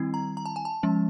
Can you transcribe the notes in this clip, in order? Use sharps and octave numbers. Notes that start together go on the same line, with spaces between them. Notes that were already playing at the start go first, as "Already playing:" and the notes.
Already playing: D#3 G3 C4 E4
A#5
A#5
A5
G#5
A5
F3 G#3 C#4